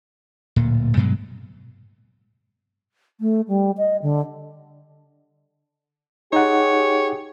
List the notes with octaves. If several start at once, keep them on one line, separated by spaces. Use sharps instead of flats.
D1 A#2
G2 B2 F#3 G#3
A3
G3
D#5
D3
D#4 G4 G#4 C#5 F#5